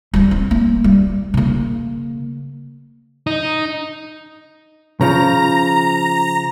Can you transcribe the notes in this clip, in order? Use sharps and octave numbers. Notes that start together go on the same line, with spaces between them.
G3 C4
C4
A#3
G3
C#3 A#3
D#4
C#3 F3 A#5